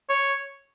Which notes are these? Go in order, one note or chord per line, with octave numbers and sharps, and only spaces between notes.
C#5